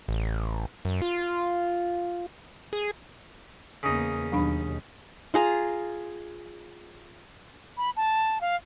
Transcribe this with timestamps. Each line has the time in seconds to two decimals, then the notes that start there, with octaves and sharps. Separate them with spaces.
0.08 A1
0.85 F#2
1.02 F4
2.73 G#4
3.83 E2 C#3 A#3 B3 D#4
4.32 D#2 B2 F#3 D4 B5
5.34 F4 G#4 A#5
7.77 B5
7.96 A5
8.41 F5